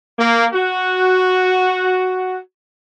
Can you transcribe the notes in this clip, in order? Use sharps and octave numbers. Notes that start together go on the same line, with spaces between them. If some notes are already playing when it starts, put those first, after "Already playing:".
A#3
F#4